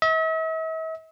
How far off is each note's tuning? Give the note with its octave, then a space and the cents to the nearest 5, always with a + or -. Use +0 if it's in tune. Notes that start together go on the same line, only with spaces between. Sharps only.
E5 -45